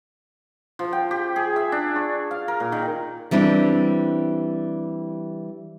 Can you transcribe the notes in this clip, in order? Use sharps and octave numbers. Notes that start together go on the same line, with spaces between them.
F3
G5
G4
G#4
E5
D4
C#6
F5
A#4
A#2
D#3
E3 G3 C4 D4